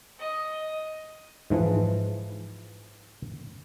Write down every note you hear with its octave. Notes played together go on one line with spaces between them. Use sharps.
D#5
G#2 E3 F3